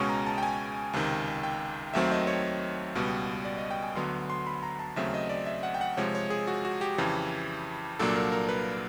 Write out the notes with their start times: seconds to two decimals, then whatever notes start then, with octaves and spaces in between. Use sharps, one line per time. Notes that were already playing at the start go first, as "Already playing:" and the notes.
Already playing: C#2 B2 G#3 C#4 C#6
0.09 A#5
0.26 A5
0.38 G5
0.43 G#5
0.93 C#2 C3 D#3
1.43 G5
1.94 D#2 D#3 F#3 A3 C4 E5
2.11 D#5
2.27 C#5
2.95 C#2 B2 G3 B3
3.45 D5
3.57 D#5
3.70 G5
3.83 G#5
3.95 D2 D3 F#3 B3 C6
4.30 C6
4.46 B5
4.63 A#5
4.79 A5
4.96 D#2 C#3 F#3 A3 C4 E5
5.14 D#5
5.29 D5
5.46 E5
5.63 F#5
5.74 G5
5.81 F#5
5.97 C3 F3 G#3 C#5
6.15 C#5
6.30 G#4
6.47 F#4
6.65 F#4
6.81 G4
6.98 F2 C#3 E3
7.99 C2 A#2 F#3 A#3 D4 A4
8.15 A#4
8.32 A#4
8.49 B4